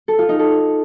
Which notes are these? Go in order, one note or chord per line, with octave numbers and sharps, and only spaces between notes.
A4
F4
D#4
A4